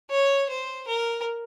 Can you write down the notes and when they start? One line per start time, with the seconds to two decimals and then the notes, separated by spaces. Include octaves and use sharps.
0.11 C#5
0.49 C5
0.88 A#4